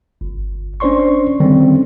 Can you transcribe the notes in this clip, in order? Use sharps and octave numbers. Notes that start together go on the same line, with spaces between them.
G1
C#4 D4 C5 D5 C6 C#6
D3 D#3 G3 C4 C#4